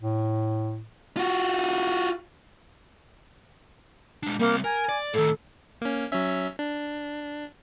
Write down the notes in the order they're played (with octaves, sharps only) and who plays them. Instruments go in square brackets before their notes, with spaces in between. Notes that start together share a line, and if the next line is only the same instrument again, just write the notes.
[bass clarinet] A2
[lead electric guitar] F4 F#4
G#3 D4
[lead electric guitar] G3 C4 [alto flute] A#3
[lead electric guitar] A#4 [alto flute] G#5
[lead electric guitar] D5
[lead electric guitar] A2 D#3 [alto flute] A4
[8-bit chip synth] A#3 C#4
F#3 C#4 E5
D4